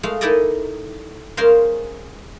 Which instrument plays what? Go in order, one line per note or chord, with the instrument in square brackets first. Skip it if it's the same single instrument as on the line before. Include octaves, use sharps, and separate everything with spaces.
[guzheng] G#3 A3 F5
D#4 E4 A4 A#4 D5 D#5
G#3 C#4 A#4 C5 F5 C6